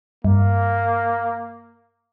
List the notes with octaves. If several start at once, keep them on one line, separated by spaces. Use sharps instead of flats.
G2 A#3